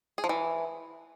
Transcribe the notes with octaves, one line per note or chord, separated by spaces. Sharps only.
G#4
F3
E3